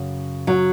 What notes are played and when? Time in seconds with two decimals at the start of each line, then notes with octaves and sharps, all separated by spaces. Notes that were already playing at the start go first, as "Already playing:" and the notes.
Already playing: F#2 C#3
0.47 F#3